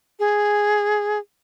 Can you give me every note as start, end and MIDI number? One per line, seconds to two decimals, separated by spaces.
0.19 1.19 68